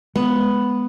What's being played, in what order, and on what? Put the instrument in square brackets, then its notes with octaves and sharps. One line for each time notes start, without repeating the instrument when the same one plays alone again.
[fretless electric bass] G#3 [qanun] B3